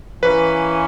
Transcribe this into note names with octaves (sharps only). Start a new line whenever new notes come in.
E3 A#3 C#4 B4